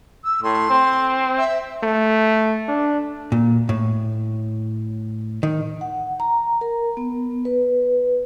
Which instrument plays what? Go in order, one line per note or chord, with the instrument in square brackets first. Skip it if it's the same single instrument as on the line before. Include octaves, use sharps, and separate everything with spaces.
[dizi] E6
[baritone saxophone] A2 [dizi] C6
[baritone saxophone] C4
[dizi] E5
[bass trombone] A3
D4
[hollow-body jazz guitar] A#2
A2
D#3
[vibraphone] F#5
A#5
A#4
B3
B4